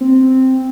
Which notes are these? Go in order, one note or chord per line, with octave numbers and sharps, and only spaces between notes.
C4